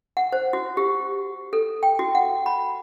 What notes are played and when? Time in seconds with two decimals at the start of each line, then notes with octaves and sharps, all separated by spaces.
0.17 F#5
0.33 C5
0.53 F#4
0.77 G4
1.53 A4
1.83 G5
1.99 F#4
2.15 F#5
2.46 B5